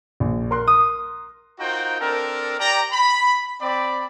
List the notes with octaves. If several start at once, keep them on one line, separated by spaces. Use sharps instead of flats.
A#1
A#4 C6 F#6
D#6
D#4 F4 F#4 A#4 C5 G5
C4 D4 A4 A#4
G4 D5 G5 A#5
B5
C4 D5 B5